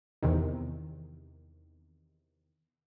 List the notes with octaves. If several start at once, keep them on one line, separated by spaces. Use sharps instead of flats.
E2 C3 D#3